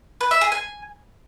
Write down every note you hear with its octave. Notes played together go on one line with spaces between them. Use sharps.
B4
E5
G#4
G#5